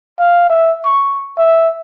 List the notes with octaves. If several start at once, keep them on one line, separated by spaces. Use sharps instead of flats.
F5
E5
C#6
E5